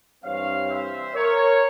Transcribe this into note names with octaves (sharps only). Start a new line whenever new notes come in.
G2 E3 G3 C4 C#5 F5
C5 E5
A#4 C#5